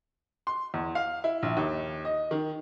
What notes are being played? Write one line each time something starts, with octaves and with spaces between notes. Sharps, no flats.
C6
E2
F5
E4
A#1
D#2
D#5
D#3